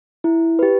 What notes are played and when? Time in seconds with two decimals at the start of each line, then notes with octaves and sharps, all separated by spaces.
0.24 E4
0.59 G4 B4